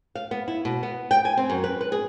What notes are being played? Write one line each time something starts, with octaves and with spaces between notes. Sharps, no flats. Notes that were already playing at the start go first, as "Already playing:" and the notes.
F5
B3
E4
B2
B3
G5
G#5
C4
F#2
B4
B4
G#4